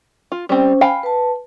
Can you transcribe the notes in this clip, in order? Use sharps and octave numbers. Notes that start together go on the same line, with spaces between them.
F4
G3 C4 C#4 C5
F5 G5 G#5 B5
B4 A5